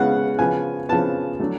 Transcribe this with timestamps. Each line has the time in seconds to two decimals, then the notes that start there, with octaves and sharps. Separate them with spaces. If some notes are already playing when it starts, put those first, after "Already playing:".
Already playing: C#3 G#3 B3 F5 F#5
0.39 C#3 F3 B3 G#5
0.89 C#3 F3 B3 A5
1.40 D3 F#3 A3